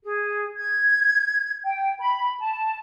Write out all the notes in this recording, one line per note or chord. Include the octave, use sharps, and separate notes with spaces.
G#4
G#6
G5
B5
A5